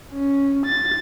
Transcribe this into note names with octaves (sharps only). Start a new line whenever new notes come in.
C#4
A6